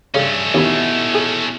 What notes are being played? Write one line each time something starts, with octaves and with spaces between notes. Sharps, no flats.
G2 C#3 A3 C#4
D#2 B2 E4
G#4